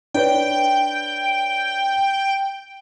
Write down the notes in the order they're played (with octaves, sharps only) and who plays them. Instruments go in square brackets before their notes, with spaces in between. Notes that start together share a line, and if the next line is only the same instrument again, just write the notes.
[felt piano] D4 B4 C#5 [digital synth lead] G5